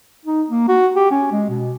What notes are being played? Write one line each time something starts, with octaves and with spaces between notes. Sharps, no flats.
D#4
A#3
F#4
G4
C#4
G#3
B2